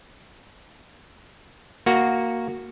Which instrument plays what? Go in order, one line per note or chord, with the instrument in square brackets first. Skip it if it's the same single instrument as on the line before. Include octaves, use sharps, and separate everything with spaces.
[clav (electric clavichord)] A#3 F#4